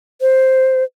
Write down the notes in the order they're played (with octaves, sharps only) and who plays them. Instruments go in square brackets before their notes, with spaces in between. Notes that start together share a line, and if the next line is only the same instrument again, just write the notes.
[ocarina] C5